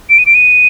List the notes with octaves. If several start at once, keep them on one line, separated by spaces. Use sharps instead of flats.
D7
D#7
D7
D#7